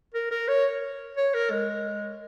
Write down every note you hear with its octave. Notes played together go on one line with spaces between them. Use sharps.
A#4
A#4
C#5
C#5
A#4
G#3